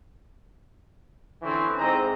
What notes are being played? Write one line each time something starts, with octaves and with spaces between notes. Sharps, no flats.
D3 E3 C4 C#4
G#2 C4 D#5 A#5